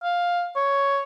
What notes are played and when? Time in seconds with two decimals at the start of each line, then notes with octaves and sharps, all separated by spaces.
0.03 F5
0.56 C#5